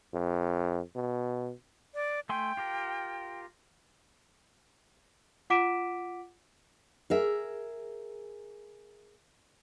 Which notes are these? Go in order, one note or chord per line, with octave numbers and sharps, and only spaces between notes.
F2
B2
D5
A3 G5 G#5 C6
F4 G4 A#4
F4 F#5 D6 B6 D7 E7
G#4 A#4 E5